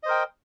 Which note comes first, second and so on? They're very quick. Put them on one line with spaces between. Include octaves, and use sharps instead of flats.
D#5 C5 A#4 G5